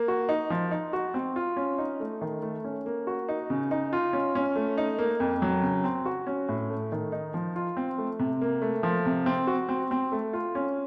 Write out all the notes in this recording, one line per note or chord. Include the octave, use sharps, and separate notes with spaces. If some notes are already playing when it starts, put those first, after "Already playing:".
Already playing: A#3
F#4
D#4
F3
D#4
F#4
C4
F4
C#4
D#4
A3
D#3
A3
C#4
A#3
F#4
D#4
C#3
D#4
F4
C#4
C#4
A3
D#4
A#3
F2
F#3
C#3
C4
F#4
C#4
A2
A3
D#3
D#4
F3
F4
C4
A3
C3
A#3
A3
F3
C3
C4
F#4
C4
C4
A3
F4
C#4